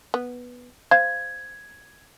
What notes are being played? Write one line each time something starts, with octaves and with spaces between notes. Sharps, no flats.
B3
C5 F5 G#6